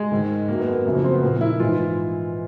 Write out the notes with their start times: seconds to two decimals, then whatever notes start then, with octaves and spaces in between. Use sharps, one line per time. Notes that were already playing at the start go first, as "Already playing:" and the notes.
Already playing: G#3
0.12 G#2 D#3
0.48 F#2 D#3 A#3
0.60 B3
0.73 A#3
0.85 F#2 C#3 F3 A3
0.95 A#3
1.04 C4
1.14 B3
1.23 A#2 F3 A#3
1.41 E4
1.60 G#2 E3 F4